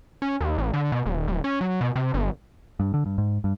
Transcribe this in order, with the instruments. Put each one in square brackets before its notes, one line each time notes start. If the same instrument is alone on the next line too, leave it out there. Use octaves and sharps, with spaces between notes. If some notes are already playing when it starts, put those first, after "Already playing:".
[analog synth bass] C#4
D#2
A1
D3
B2
D#1
D1
C#4
F#3
B2
C3
G1
[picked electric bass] G2
D3
G2
G#2
G2